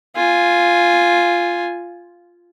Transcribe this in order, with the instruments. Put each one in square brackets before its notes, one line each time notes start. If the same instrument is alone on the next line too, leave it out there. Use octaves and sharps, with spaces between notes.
[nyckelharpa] F4 G#5